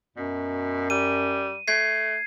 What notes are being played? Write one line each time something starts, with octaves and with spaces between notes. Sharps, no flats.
F#2 B2
G3 D#7
A3 G#6 C7